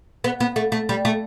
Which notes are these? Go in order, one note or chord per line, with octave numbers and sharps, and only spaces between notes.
B3
B3
A3
A3
G3
A3